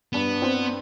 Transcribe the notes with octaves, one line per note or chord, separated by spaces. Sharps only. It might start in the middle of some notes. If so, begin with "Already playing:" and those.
G2 B3
C4